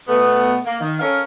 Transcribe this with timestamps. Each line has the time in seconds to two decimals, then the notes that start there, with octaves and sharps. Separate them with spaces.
0.08 B2 A3 B3
0.66 A#3
0.80 D#3
1.00 C#4 A4 A#4 C#5 F5